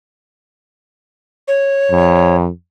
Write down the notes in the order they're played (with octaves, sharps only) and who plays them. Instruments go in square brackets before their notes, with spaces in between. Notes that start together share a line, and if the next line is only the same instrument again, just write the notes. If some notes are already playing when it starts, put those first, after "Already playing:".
[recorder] C#5
[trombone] F2